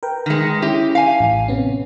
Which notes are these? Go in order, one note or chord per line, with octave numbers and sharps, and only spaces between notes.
A#4 B4 G5
D#3 G#3 A#6 C#7
C#4 E4 G4
F5 G#5
A1
C3 B3 C#4